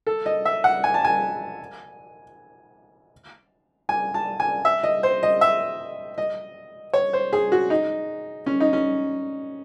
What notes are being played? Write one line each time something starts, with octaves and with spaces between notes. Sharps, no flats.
A4
D#5
E5
F#5
G#5
A5
G#5
G#5
A5
G#5
E5
D#5
C5
D#5
E5
D#5
C#5
C5
G#4
F#4
D#4
C#4
D#4
C#4